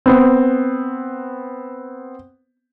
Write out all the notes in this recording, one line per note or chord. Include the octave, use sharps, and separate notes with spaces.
B3 C4